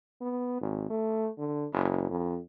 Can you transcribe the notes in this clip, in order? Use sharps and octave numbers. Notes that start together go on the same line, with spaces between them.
B3
G#1
A3
D3
F#1
F2